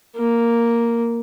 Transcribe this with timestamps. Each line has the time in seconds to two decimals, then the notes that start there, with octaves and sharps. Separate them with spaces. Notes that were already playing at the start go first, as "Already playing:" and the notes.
0.17 A#3